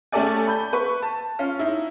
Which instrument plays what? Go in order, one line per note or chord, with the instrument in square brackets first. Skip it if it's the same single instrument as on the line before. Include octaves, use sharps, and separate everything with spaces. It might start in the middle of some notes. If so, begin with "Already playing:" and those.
[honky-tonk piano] A3 C#4 G4 A4 D5 G#5
B5 G6
B4 C#6
A5
C#4 F4
D#4 E4